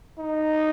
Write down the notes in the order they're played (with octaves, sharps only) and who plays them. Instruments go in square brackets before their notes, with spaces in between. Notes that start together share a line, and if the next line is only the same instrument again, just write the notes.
[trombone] D#4